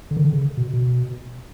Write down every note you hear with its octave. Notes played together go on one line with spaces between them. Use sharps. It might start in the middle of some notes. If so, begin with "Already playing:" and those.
D3
D#3
D3
C#3
B2
B2